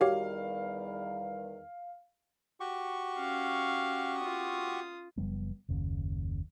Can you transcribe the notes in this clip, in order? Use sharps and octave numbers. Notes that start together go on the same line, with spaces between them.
E2 D#3 G3 F#4 G4 C#5 F5
F#4 G4 C#6
C#4 F5
F4 D#6
F#1 F3 G3 B3
F#1 D#2 C#3